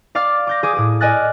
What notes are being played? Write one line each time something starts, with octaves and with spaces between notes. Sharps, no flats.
D5 F5 D6 F6 A6
D6 G6 A#6
G#4 D6 D#6
A2 G#4 D#6
D5 D#5 G#5 F6 F#6 A6